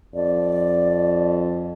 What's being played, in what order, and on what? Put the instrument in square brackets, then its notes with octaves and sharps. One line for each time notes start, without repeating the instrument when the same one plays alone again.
[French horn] F2 [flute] D5